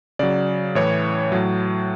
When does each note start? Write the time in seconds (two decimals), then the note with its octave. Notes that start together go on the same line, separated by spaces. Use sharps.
0.19 C#3 F#3 D5
0.75 A2 E3 C#5
1.32 A2 F#3